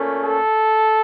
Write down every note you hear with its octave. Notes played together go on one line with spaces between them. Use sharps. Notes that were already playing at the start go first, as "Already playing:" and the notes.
Already playing: A#2 A3 C#4
A4